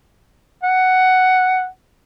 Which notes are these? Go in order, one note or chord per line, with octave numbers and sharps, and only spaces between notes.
F#5